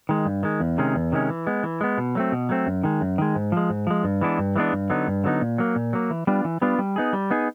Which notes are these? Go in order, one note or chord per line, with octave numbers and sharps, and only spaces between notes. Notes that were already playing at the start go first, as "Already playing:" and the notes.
D#3 G#3
G2
D#3 G#3
E2
C3 D#3 G#3 C#4
E2
C3 D#3 G#3 C#4
E3
G#3 B3
E3
G#3 B3
B2
F#3 A3 C4
B2
F#3 A3 C4
F#2
D#3 G#3
F#2
D#3 G#3
G#2
F3 G#3
G#2
F3 G#3
G2
E3 G#3 B3 D4
G2
E3 G#3 B3 D4
G2
D3 F#3 B3 D#4
G2
D3 F#3 B3 D#4
A#2
F#3 A#3
A#2
F#3 A#3
E3
G3 B3 D4 F4
E3
G3 B3 D4 F4
G3
B3 D#4 G#4
G3
B3 D#4 G#4